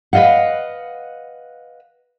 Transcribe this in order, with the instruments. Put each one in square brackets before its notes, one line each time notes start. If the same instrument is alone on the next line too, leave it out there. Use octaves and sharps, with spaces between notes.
[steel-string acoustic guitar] B4 D5 D#5 F5 F#5